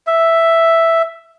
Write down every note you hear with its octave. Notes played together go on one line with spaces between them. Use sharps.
E5